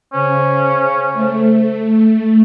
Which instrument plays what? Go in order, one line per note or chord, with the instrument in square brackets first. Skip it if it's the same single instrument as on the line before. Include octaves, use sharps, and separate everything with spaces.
[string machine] C#3 [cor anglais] C#4 [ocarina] C5
[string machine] A3